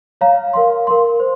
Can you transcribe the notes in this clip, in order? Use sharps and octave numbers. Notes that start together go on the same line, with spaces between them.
C#5 F5 A#5
A#4 F5 C6
A#4 F5 C6
C5